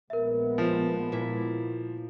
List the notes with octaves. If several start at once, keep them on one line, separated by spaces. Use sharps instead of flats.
A#1 G#3 B3 A#4 E5
F3
A#2 E4